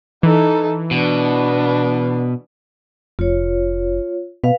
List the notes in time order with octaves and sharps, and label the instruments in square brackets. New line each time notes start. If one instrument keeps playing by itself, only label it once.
[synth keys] E3 [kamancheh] D#4 A4
[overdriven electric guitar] B2 [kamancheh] B3 D4
[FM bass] F1 [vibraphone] F4 C#5
[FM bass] B2 [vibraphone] B4 F5